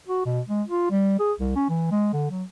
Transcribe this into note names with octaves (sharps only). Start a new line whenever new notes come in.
F#4
B2
G#3
F4
G3
G#4
C2
C#4
E3
G#3
D3
F#3